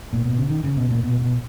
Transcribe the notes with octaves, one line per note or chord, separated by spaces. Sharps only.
A#2
B2
C#3
D#3
C#3
B2
A#2
B2
B2